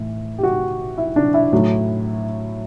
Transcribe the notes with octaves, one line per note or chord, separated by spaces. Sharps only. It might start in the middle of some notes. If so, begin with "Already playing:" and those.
Already playing: A2 E3
G4
F#4
E4
D4
E4
A2 F#3 A3